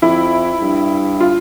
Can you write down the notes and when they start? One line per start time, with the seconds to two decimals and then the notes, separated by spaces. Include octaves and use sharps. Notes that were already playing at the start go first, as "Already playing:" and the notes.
0.02 F2 E4
0.62 G2
1.20 F4